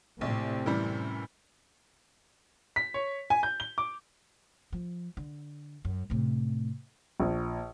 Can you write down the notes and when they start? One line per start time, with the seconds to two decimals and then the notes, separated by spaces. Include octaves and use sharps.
0.21 A#1 A2 C3 C4
0.66 F#2 E3 G3
2.76 B6
2.94 C#5
3.30 G#5
3.43 G6
3.60 G7
3.78 D6
4.72 F3
5.17 D3
5.85 F#2
6.10 A2 C3
7.20 A#1